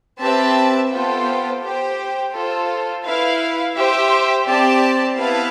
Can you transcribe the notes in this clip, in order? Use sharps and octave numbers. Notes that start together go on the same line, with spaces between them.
C4 G4 B4 E5 A5
B3 F4 A4 C5 G5
G4 C5 G5
F4 A4 C5
E4 B4 F5
G4 C5 E5
C4 G4 D5 A5
B3 E4 B4 F5 A5